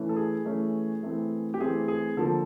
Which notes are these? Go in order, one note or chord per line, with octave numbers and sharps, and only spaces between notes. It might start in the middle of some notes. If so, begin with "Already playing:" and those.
Already playing: E3 A3 C#4
A4
G#4
E3 A3 C#4
E3 A3 C4
G4
E3 A3 C4 G#4
G#4
D3 F3 A#3 A4